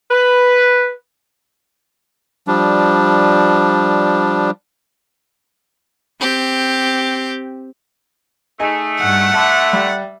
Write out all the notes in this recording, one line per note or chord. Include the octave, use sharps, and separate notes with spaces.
B4
F3 G3 D4
C4 G4
A3 D#4 G#4 D#5
G2 F#5
D3 A3 E5 A5
G3